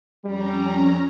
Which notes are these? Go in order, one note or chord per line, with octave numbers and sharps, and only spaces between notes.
F2 G3 C#4 A#5